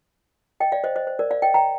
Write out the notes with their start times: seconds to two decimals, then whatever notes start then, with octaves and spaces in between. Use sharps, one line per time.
0.60 D#5 G5
0.72 D5 F5
0.84 C5 D#5
0.96 C5 D#5
1.07 C5
1.19 A#4 D5
1.31 D5 F5
1.42 D#5 G5
1.54 G5 A#5